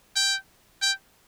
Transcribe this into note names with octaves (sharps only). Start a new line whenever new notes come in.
G5
G5